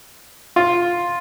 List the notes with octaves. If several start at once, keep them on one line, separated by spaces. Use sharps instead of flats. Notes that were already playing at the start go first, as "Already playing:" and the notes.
F4